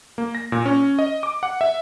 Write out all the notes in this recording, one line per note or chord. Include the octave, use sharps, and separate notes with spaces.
A#3
A#6
A#2
C#4
D#5
D6
F#5
E5